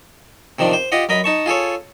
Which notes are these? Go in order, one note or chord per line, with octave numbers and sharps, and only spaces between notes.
C3 D#3 F3 D4
C5
F4 G4 D#5 F#5
F#2 A#4 D#5 B5
D#4 A5 C#6
F4 G#4 A4 C#5